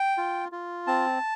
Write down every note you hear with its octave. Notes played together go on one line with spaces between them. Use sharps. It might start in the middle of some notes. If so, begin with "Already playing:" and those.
Already playing: G5
F4
F4
C4 A5